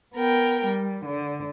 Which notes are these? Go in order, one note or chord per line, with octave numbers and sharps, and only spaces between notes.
B3 A#4 G5
G3
D3